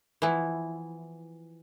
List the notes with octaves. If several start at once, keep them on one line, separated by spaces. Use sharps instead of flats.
E3 F3 B3 E4